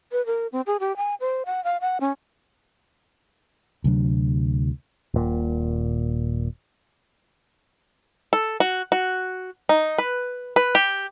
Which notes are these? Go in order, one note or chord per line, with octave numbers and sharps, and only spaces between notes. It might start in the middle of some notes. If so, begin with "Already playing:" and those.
B4
A#4
C4
G#4
G4
G#5
C5
F#5
F5
F#5
C#4
D2 C3 F#3 D4
D#1 A#2
A4
F#4
F#4
D#4
B4
B4
G4